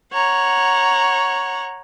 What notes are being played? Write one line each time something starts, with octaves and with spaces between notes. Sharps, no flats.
C#5 F#5 A#5